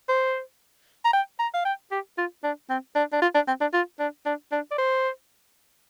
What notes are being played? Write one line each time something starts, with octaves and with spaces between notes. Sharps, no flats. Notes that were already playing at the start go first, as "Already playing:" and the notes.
C5
A#5
G5
A#5
F5
G5
G4
F4
D4
C4
D4
D4
F4
D4
C4
D4
F4
D4
D4
D4
D5
C5